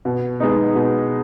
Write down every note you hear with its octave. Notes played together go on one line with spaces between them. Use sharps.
B2
G#3 B3 D#4
B2